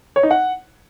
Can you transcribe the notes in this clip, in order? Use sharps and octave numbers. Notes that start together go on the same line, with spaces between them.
C#5
D#4
F#5